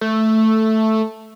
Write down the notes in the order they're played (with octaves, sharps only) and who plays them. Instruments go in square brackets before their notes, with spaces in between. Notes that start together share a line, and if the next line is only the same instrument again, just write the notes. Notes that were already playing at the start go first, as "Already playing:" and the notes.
[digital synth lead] A3